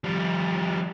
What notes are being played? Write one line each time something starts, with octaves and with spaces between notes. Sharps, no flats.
F3 G3